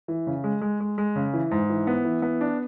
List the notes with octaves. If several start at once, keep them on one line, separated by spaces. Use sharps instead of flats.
E3
C#3
G#3
G#3
G#3
G#3
C#3
E3
G#2
E3
B3
E3
B3
D4